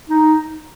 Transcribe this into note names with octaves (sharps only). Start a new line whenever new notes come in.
D#4